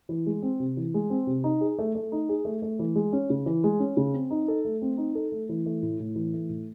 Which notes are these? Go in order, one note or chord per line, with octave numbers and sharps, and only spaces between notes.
E3
G#3
C4
C3
E3
G#3
C4
C3
D#4
G#4
A3
A3
D#4
G#4
A3
A3
E3
G#3
C#4
C#3
E3
G#3
C#4
C#3
C4
D#4
A4
A3
C4
D#4
A4
A3
E3
A3
A2
A2
E3
A3
A2